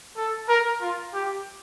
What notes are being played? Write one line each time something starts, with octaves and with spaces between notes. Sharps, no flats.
A4
A#4
F4
G4